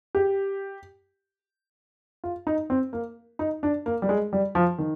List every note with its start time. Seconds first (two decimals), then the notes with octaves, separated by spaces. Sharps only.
0.15 G4
2.24 F4
2.47 D#4
2.70 C4
2.93 A#3
3.39 D#4
3.63 D4
3.86 A#3
4.02 G3
4.09 G#3
4.33 G3
4.55 F3
4.79 D#3